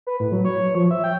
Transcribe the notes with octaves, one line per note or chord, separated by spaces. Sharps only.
B4
A2
F#3
C#5
F3
E5
G5